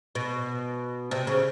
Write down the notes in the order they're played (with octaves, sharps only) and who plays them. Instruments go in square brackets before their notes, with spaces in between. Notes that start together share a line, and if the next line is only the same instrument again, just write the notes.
[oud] B2
C3
C#3